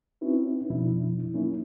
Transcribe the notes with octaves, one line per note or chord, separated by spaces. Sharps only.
C4 C#4 D#4 E4 F#4 B4
F2 B2 F3 D4 E4
F#3 A#3 C#4 D#4 E4